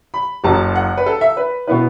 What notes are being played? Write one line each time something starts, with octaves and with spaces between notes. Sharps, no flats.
B5
F#1 F#2 F#3 A5
F#5
B4
A4
E5
B4
B2 B3 E4 B4